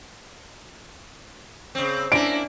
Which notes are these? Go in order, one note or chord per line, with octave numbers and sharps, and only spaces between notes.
C#3 C4
A#3 C#4 D4 E4 D7